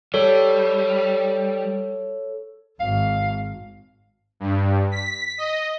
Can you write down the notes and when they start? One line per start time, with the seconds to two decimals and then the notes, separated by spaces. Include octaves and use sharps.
0.14 G3 A4 C#5
2.80 G#1 F5
4.40 G2
4.91 B6
5.38 D#5